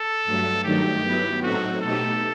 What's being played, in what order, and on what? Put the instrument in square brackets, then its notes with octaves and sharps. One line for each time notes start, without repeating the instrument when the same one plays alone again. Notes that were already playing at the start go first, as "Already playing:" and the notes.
Already playing: [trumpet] A4
[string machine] G2 F#3 A3
[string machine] G2 D#3 F#3 A3 D#4 [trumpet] G4
[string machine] F#3 B3 E4
[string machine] A2 F#3 C4 D#4 A4 [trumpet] F#4
[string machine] B2 A3 D#4 G4 [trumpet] A4